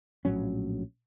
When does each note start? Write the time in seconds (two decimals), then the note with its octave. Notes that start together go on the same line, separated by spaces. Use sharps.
0.25 A#1 A2 F#3 C#4